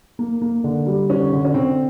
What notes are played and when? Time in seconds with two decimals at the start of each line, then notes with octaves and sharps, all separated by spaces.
0.19 A#3
0.42 A#3
0.64 D3
0.87 G3
1.09 D3 C#4
1.33 D3
1.45 C#4
1.54 D3 C4